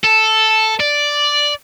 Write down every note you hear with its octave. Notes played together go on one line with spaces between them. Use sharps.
A4
D5